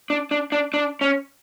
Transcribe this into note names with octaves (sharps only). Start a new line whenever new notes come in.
D4
D4
D4
D4
C#4